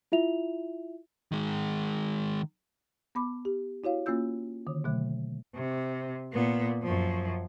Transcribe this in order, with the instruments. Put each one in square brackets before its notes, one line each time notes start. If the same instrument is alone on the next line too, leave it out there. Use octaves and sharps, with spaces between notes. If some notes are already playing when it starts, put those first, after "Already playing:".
[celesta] E4 F4 E5 F7
[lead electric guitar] D#3 G#3
[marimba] B3 B5 D6
G4
E4 F#4 C#5 F5
A#3 C#4 F4 E6 G6
D3 D#3
B2 D3 F#3 A3
[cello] C3
A#2 B3
F#2 F3